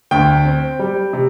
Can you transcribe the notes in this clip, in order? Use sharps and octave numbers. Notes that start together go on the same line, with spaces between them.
D2 G5
C4
G3
C3